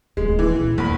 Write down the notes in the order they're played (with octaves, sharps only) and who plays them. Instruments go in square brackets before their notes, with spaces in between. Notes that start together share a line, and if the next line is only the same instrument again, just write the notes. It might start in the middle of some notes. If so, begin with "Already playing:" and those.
[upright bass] D1 C#3 [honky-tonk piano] G#3
[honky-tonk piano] E3
[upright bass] A#2 C#4
[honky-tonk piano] A#1 B5 [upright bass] D#2